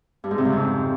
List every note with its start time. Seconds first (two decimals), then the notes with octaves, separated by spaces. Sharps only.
0.24 G2
0.31 G#2
0.38 C3
0.45 C#3
0.52 F2